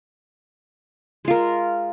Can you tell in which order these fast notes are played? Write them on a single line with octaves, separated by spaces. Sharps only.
G#3 F4 A#4